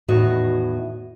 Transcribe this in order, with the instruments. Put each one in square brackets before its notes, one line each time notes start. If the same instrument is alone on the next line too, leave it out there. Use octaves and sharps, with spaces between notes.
[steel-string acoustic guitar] E2 A2 D#3 E3 F#4 D#5